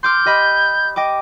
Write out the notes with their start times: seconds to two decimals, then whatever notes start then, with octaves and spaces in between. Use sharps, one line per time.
0.03 C6 D6 F6 G6
0.26 G4 D#5 B5
0.96 D#5 G5 D6